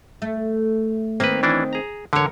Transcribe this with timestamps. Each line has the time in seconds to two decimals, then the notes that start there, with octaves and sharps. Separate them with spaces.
0.22 A3
1.20 D#3 A#3 C4 B4
1.43 E3 C#4 D4
1.73 G#4 A#5
2.13 E2 D3 A#4 C#5